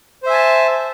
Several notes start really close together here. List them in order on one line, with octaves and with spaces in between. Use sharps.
C5 E5 G#5 A5